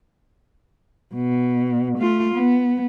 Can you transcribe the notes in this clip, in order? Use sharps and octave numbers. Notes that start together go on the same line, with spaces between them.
B2
A3 F4
B3